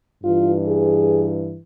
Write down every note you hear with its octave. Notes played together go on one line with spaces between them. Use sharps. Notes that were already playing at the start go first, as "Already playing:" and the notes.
G2 E3 F4
G#4